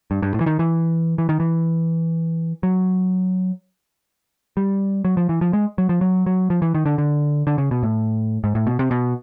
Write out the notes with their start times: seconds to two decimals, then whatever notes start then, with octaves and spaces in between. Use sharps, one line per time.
0.11 G2
0.23 G2
0.34 A2
0.41 E3
0.46 D#3
0.59 E3
1.18 E3
1.29 D#3
1.40 E3
2.63 F#3
4.57 G3
5.05 F#3
5.17 F3
5.29 E3
5.41 F3
5.53 G#3
5.78 F#3
5.89 F3
6.01 F#3
6.26 F#3
6.50 F3
6.62 E3
6.75 D#3
6.86 D3
6.98 D3
7.47 D3
7.58 C#3
7.71 B2
7.83 A2
8.44 G#2
8.55 A2
8.67 B2
8.79 C3
8.91 B2